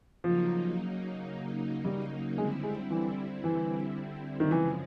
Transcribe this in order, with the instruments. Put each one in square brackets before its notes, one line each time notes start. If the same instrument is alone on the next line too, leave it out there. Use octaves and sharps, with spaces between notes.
[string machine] C#3 F#3 A#3 D#4 [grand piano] F3
[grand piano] G3
[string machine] D3 G3 C4 E4 [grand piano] G#3
[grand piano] G#3
E3
E3
D#3
[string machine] F#2 C#3 F3 G#3 [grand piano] E3